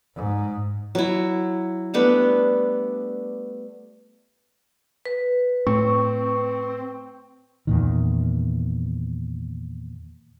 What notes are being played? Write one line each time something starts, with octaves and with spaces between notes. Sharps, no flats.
G#2
F#3 E4
G3 A3 B3 D4
B4
A2 C4 C#6
E2 A#2 D#3